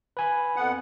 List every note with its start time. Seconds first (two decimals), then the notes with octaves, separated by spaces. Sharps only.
0.17 B4 G#5 B5
0.56 F2 B3 F#5